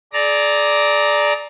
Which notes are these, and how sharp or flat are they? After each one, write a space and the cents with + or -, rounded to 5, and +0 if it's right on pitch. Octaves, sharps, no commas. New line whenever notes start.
G#4 +35 D5 +0 A#5 +0